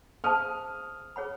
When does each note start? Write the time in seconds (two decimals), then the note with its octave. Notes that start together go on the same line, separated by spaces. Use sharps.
0.24 G#4 C5 F5 A5 D#6 F6
1.16 G#4 C#5 F#5 B5